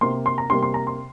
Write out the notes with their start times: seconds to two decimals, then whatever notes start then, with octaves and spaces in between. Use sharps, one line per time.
0.01 C3 A#3 C6
0.26 C6
0.38 A#5
0.50 C3 G3 A#3 C6
0.63 C6
0.74 A#5
0.87 C6